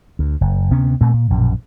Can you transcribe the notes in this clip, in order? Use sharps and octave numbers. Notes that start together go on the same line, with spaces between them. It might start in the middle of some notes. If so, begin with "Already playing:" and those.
D2
F#1
D2 C3 B3 C#4
A#2 A3 C4
A#2
A#1 F#2 B2